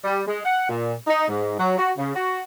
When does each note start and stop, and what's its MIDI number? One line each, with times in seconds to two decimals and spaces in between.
0.04 0.21 55
0.27 0.39 56
0.45 0.66 78
0.69 0.92 46
1.07 1.26 63
1.28 1.56 44
1.58 1.76 54
1.78 1.90 66
1.98 2.11 49
2.14 2.40 66